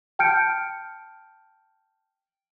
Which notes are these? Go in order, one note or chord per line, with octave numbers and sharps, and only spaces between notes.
G5 A5 F6 G6 C#7 D7